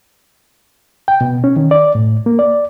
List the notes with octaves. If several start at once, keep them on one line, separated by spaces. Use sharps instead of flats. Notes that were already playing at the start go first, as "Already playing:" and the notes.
G5
B2
C#4
D#3
D5
A2
A#3
D5